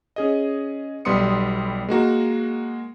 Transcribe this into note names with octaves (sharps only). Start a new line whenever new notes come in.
C#4 G#4 D#5
B1 G3 B3 C6 D#6 C#7
G#3 A#3 F#4 A#5